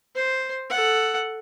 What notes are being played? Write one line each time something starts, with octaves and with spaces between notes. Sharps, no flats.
C5
A4 F#5